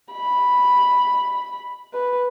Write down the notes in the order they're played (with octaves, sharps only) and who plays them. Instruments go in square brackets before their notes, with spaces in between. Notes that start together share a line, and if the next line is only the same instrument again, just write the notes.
[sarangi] B5
B4